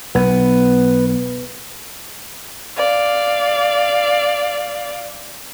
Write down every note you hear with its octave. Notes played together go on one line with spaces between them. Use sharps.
B1 B3
D5 F5